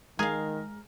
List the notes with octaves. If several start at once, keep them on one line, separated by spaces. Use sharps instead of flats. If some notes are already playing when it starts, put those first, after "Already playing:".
D#3 G#3 G#4 A#4 F5